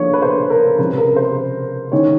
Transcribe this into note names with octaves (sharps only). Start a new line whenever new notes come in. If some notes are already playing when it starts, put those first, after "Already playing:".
Already playing: D3 F3 A#3 C#5
B4
C5
A#4
C3 F3 G#3 C#4 B4
A#4
C5
D#3 G#3 C#4 C#5